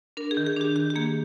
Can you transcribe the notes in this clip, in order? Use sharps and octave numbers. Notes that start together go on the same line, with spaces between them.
D4 A#4
G#4
D#3
G#4
D4 G4
D#3 G4
G4
A#3 G#4